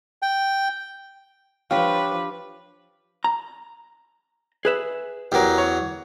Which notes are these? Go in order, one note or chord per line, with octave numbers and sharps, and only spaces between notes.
G5
F3 D4 G4 B4 C#5 F5 G5 C#6
A#5
G#4 B4 E5
E2 F#3 G4 A#4
C#5